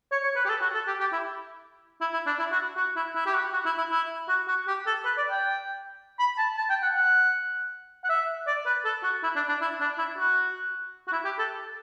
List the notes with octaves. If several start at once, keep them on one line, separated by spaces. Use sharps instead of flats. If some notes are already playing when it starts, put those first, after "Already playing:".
C#5
C#5
B4
G4
A4
F#4
A4
G4
G4
E4
E4
E4
D4
E4
F#4
F#4
E4
E4
G4
F#4
F#4
E4
E4
E4
F#4
F#4
G4
A4
B4
D5
G5
B5
A5
A5
G5
F#5
F#5
F#5
E5
D5
B4
A4
F#4
E4
D4
D4
E4
D4
E4
F#4
F#4
E4
G4
A4